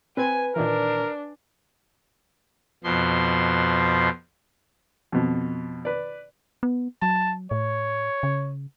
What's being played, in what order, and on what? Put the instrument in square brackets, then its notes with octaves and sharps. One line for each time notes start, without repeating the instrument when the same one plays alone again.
[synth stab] C4 G#6 [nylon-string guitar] B4 [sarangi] G#5
[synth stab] A#2 D#3 E3 [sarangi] D4 [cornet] A#4
[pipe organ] F2 B2 F3 C6
[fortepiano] F2 B2
B4 D5
[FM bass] B3
[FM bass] F#3 [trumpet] A5
[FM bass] A2 [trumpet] C#5
[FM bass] C#3